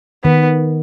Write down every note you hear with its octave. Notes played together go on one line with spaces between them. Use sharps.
D#3 B3